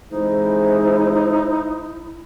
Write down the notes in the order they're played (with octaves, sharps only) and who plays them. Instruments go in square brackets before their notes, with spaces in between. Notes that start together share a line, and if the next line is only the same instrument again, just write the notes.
[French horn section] C3 E3 G#3 [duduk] D#4 [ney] E4 [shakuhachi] C5